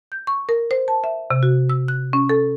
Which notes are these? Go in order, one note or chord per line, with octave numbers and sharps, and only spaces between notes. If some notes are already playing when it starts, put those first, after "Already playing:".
G6
C#6
A#4
C5
A5
E5
C3
F#4
E6
F#6
C#4
A4